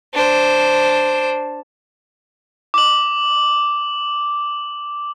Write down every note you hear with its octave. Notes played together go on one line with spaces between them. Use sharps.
D4 C5
D6 F#7